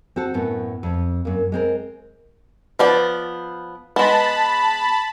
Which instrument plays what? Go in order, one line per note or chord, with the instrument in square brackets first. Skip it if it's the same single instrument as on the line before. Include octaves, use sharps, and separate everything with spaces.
[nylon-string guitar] C4 F#4 A4
F#2 A2 B3
F2
F#2 A#3
G#3 C4 A#4
[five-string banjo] F3 B3 D5
[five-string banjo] G#3 B3 [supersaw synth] A5 B5